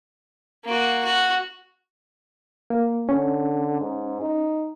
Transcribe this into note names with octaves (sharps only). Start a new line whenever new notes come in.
A#3 F#4
F#4
A#3
D3 C#4
G#2
D#4